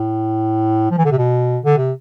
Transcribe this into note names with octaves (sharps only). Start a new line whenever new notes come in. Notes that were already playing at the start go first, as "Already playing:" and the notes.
Already playing: A2
F3
E3
D3
C3
B2
D3
C3